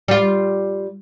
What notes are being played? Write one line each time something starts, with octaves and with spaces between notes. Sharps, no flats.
G3 F4